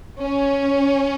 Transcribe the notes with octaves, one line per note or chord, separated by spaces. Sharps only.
C#4